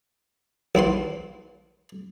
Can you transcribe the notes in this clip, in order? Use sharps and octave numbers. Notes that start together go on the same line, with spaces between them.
A#1 E4 B4 C6